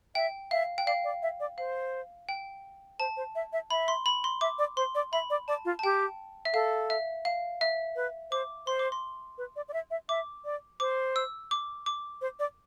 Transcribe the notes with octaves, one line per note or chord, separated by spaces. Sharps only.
E5 G5
E5 F5
G5
D5 F5
D5
E5
D5
C5 F5
G5
C5 A5
C5
E5
E5
E5 B5
C6
B5
C6
E5 D6
D5
C5 C6
D5
E5 B5
D5
D5 A5
F4
A5
G4 G5
E5
A4 F5
E5
F5
E5
B4
C5 D6
C5 C6
D6
C6
B4
D5
D5
E5
E5
E5 D6
D5
C5 D6
E6
D6
D6
C5
D5